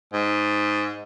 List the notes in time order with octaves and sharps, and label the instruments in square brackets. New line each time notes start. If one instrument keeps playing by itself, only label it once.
[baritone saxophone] G#2